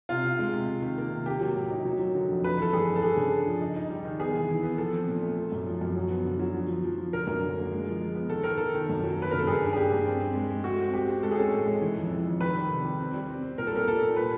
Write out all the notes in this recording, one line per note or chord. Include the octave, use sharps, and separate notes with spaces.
C3 F4
C3
G#3
C3
C3
D#3
A#3
C3
A#3 G4
F#3
A2
D#4
F#3
F#3
D3
F2
A3 B4
E3 A4
G2 G#4
A3
A4
D4 G#4
C#3
D4
F3
D#4
D#4
G3
D#3
B3 G#4
E3
E3
B3
F3 A4
C4
A#2
A3
A3
F#2
F3
F#2
F#3
B3
D3
F#3
F3
F3
F3
F3
D3 A#4
F#2
D3
A#3
G#3
F3
G#3
B3
D#3 A4
D#3 A#4
D#3 A4
D#3
F#2
F#3
A#3 B4
C#3 A#4
A4
G2 G#4
G3
G#4
A#3 G4
G2
C4
C4
G#3
G#3
A3 F#4
C4
C4 G4
C4
G#3 A4
G#4
C#4 A4
A2
G#3
E3
F2
E3
F2
D#3 B4
G3
C3
G3
C4
G3
C4
C4
A#2 A#4
A4
G3 A#4
A#2 A4
A#2
B4